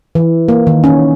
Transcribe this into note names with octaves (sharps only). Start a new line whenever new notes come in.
E3
A#3
D#3
C#4